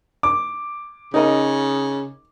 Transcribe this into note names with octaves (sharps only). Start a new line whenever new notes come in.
D6
C#3 D#4 A#4 D#5